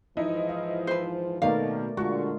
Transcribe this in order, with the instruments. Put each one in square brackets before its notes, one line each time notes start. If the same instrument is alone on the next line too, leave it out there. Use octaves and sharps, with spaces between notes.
[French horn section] G#2 E3 F3 [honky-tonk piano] D#4 E4 D#5
[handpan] F5
[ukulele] B4 C5
[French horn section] B2 [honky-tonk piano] D#3 A#3 [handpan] A3 A#4 D5 [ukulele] F5
[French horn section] A#2 D3 [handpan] G#3 F4 [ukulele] F#4 [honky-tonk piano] C#6